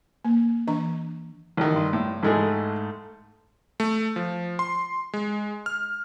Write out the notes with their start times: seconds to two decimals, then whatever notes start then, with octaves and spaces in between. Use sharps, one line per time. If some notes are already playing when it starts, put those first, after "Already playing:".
0.25 A#3
0.68 E3 D4 A#5
1.57 A1 D#3
1.73 G2 C6
1.93 A2
2.23 A1 G#2 G#3 A3 G#4
3.80 A3
4.16 F3
4.59 C6
5.13 G#3
5.66 F6